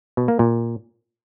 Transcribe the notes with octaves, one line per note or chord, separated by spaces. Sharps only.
B2
A#3
A#2